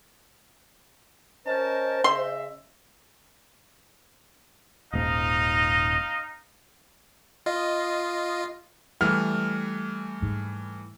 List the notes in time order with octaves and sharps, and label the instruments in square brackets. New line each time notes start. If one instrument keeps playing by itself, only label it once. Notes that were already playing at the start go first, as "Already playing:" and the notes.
[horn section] C#4 A#4 A5 [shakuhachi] C5 [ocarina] D#5
[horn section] C#3 E5 [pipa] C6
[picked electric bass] D#1 G#2 [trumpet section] D#4 D#5 F5
[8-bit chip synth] F4 [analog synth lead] D#5
[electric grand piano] E3 G3 A3 [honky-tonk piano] F6
[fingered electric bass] G#2